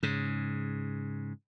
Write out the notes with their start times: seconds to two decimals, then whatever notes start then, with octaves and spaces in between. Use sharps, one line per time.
0.03 G#2 C#3